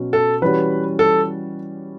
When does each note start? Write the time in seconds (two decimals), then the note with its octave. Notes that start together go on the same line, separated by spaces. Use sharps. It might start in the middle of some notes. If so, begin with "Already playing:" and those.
Already playing: B2 F#3 C#4
0.13 A4
0.42 E3 G3 C#4 F#4 B4
0.99 A4